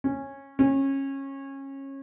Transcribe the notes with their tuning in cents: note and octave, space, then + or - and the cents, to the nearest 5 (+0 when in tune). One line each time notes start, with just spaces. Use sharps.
C#4 -15
C#4 -25